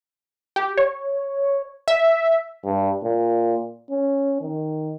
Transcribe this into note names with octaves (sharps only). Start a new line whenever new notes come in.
G4
C#5
E5
G2
A#2
C#4
D#3